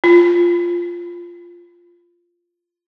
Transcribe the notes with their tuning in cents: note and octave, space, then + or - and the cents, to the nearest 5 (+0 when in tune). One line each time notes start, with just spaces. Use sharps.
F4 -5